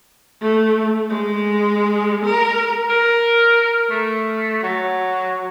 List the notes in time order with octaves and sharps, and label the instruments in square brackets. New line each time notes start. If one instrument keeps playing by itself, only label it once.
[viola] A3
G#3
A#4
[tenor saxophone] A#4
A3
F#3